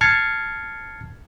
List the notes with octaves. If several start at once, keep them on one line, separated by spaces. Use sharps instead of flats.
A5 F6 G#6 A6 C7 C#7